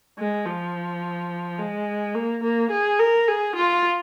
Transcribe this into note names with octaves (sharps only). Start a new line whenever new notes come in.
G#3
F3
G#3
A#3
A#3
G#4
A#4
G#4
F4